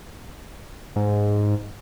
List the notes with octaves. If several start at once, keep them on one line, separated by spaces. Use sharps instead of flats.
G#2